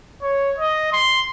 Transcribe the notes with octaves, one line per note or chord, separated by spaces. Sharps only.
C#5
D#5
C6